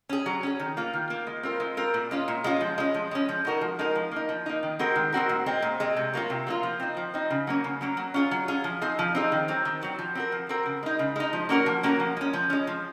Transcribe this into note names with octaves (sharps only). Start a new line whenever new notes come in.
C#4 G#4
F#3
C#4 G#4
D#3
A#3 F4
D#3
A#3 F4
G#3
C4 F4 A#4
G#3
C4 F4 A#4
A#2
G#3 C#4 F4
A#2
G#3 C#4 F4
F3
G#3 C#4
F3
G#3 C#4
F3
G#3 D#4 F#4 A#4
F3
G#3 D#4 F#4 A#4
F3
A#3 D#4
F3
A#3 D#4
D#3
G#3 C4 F#4 A#4
D#3
G#3 C4 F#4 A#4
A#2
G#3 C4
A#2
G#3 C4
C3
F#3 A#3 F4
C3
F#3 A#3 F4
F3
C4 D#4
F3
C4 D#4
C#3
F#3 A#3 C#4
C#3
F#3 A#3 C#4
F#3
C#4 F4 G#4
F#3
C#4 F4 G#4
F3
C4 D#4 G#4
F3
C4 D#4 G#4
D#3
F#3 C4
D#3
F#3 C4
F3
C4 F#4 A#4
F3
C4 F#4 A#4
C#3
G#3 D#4
C#3
G#3 D#4
F3
A#3 C#4 F#4 A#4
F3
A#3 C#4 F#4 A#4
F3
G#3 C#4
F3
G#3 C#4
F3